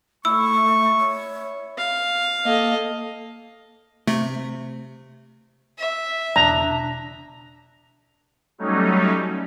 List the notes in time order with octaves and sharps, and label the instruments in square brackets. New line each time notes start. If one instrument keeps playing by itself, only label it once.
[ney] A3 [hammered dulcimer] E4 E5 [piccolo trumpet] C#6 [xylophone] E6
[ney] C#5
[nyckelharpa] F5
[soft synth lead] A#3 [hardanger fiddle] A4 D#5
[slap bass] C3 [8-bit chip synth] A3
[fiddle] E5
[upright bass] E1 C#3 [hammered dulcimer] D4 [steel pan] A#5
[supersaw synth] F#3 G3 A3 C#4 D#4